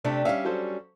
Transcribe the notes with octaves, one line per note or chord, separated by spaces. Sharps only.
C3 A3 D4 G4
G3 C#4 E5 F5
F#3 A4 C5